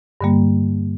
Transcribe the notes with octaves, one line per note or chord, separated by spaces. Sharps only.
G2 D3 G3 A#3